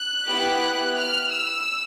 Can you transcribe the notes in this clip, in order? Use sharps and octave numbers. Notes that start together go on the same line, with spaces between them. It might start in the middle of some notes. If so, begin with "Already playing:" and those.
Already playing: F#6
B3 E4 G4
F6
E6